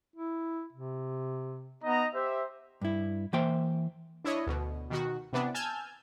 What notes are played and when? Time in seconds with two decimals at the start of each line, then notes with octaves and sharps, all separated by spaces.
0.16 E4
0.73 C3
1.83 B3 D#4 D#5 A#5
2.15 G4 C5 E5
2.82 G2 E4
3.33 E3 A#3 C5 E5 G5 C6
4.25 D4 E4 C#5 D#5
4.47 D2 B2
4.90 B2 D#3 F#4
5.33 C3 E3 B3 D4
5.54 G#5 A5 E6 F6 G6 G#6